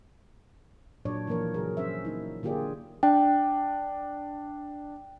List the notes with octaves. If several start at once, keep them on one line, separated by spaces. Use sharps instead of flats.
A#2 F#3 D4 C#5 D5
E3 F3 A#3 A#4 C#5
C#3 F#3 G#4 A#4
C#4 C5 E5
A#3 D#4 E4
D3 A#3 F4 G4 G#4 D5
D4 G5